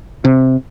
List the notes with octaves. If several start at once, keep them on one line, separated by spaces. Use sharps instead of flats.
C3